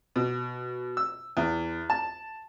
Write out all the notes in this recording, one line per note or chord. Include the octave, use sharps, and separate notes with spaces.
B2
E6
E2
A5